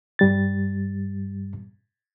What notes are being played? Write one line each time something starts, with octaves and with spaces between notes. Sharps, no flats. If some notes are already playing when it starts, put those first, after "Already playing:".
G2 G3 A6